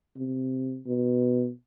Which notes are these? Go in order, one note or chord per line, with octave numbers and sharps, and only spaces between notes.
C3
B2